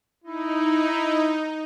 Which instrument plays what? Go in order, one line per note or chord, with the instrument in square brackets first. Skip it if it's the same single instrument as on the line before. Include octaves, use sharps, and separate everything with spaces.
[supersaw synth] D#4 [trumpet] E4